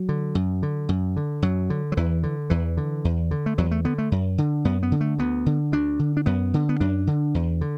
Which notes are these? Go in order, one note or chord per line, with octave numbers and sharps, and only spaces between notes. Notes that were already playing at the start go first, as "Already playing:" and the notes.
Already playing: F#3
D3
F#2
D3
F#2
D3
F#2 F#3
D3
F#3
E2 E3
D3
E2 E3
D3
E2
D3
A3
E2 F#3
A3
D3 B3
A3
F#2
D3
F#2 B3
B3
D3
A3
D2 B3
D3
D2 D4
D3
D4
F#2 B3
D3
B3
F#2 D4
D3
E2
D3